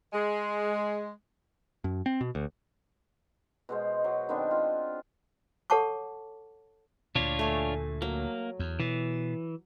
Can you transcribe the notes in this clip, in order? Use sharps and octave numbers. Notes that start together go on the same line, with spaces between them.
G#3
F#2
C4
B2
D2
B2 G#3 C5
F#3
D#3 B3 C4 D4
F4
A4 C#5 F#5 A5 C#6 D6
D2 A#2 D4 F4 C#5
A3 G#5
F#3 A#3
E2
B2 E3